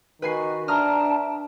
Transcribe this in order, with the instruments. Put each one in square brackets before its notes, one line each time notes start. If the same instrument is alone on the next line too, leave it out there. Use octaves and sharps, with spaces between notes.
[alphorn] D#3 [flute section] F#4 [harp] B4 G#5 C7
[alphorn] D4 [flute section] E5 G5 A5 [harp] A#5 D#6 F6